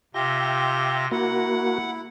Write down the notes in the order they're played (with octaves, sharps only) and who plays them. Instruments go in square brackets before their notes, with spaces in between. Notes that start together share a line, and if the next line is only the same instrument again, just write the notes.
[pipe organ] C3 A#6 [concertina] F4 G4 E5 [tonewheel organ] G5
[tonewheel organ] A#3 F#4 [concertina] E4 [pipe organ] F#5